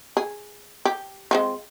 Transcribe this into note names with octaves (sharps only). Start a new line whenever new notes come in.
G#4
G4
G#3 C4 F4